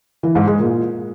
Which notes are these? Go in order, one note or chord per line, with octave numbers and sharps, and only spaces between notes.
E3
G#2
G#3
A#2